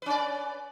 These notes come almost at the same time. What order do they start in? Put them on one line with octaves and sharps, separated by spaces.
B4 C#4 D5